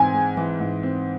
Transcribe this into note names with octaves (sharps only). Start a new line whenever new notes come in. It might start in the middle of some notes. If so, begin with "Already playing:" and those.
Already playing: G#2 E3 C4 G#5
G#3
E3
G#2
C4